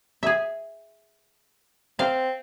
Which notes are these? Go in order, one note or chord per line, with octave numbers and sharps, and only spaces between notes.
G#4 E5
C4 F5